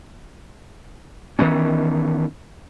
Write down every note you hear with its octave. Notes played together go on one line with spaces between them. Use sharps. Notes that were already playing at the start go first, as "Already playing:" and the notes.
D#3 E3 B3 C#4